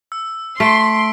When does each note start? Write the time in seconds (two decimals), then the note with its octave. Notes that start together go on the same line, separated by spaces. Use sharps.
0.12 E6
0.60 A3 C6 B6 D7